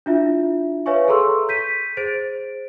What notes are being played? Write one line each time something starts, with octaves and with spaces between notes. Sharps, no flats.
D4 E4 F4 E5
B4 C#5 E5 F5 G#5 C#6
G#4 A4 A#5 C6 C#6 E6
G6 B6 D#7
G#4 C5 A6 D7